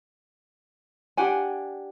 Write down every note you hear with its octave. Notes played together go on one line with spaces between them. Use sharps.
D4 G4 F#5 G#5